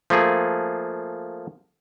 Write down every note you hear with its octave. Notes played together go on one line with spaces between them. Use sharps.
F3 A3 A#3 G#4